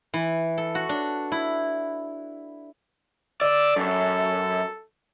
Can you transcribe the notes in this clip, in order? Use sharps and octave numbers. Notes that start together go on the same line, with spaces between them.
E3
A4
F#4
D4
E4
D5 E6
F#2 A4